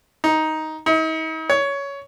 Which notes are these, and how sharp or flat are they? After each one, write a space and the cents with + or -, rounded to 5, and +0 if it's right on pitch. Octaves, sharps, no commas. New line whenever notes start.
D#4 +10
D#4 +45
C#5 +15